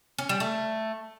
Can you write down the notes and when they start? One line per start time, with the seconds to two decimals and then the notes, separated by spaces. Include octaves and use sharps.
0.18 C#4
0.29 G3
0.40 A3